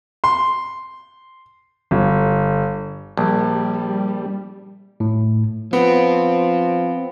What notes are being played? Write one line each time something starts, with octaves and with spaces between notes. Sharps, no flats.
C6
G1
A#1 G3
A2
F3 B3 C4